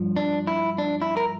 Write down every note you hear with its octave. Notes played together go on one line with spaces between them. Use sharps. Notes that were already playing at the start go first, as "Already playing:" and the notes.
Already playing: G2 F3
D4
E4
D4
E4
A#4